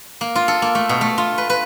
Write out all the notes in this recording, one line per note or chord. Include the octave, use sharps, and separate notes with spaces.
A#3
F4
A4
A#3
A3
B2
A3
F4
B4
B4